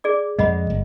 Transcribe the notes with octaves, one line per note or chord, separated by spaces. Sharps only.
G#4 D5 D6
F2 G#3 D#5 F#5 B5
G1